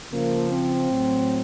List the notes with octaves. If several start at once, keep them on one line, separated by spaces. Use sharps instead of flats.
C#3 F3 A#3
C4
A2 F#3